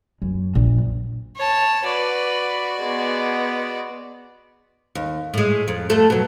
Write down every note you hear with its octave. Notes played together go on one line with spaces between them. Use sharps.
F#2
A#1
C#5 A5
F#4 B4 D5
G#3 B3
D#2
A2 G#3
F2
F2 A3 A4
B2 F#3